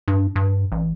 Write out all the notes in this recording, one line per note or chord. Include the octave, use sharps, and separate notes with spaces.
G2
G2
A1